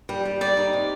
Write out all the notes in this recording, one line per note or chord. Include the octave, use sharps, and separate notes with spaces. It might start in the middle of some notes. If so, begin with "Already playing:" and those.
G3
G3
G3 D5
D#4
C3